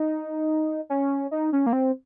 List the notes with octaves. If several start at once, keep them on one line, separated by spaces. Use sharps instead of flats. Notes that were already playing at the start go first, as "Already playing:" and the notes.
Already playing: D#4
C#4
D#4
C#4
A#3
C4